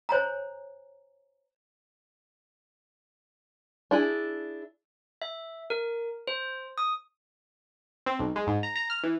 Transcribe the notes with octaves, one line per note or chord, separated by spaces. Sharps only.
C5 C#5 G#5 A#5
D4 E4 G#4
E5
A#4
C5
D#6
C4
B1
G#3
G#2
A#5
A#5
F6
E3